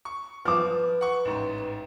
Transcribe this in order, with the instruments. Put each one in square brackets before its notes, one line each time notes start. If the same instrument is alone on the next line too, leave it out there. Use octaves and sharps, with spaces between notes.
[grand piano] C#6
[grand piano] F3 [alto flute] B4 [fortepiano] D6 F6
[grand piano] F#5 C#6
A1 G#2